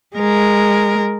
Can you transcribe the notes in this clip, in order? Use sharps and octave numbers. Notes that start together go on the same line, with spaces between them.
G#3 A#4